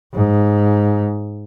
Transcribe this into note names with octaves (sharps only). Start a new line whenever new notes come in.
G#2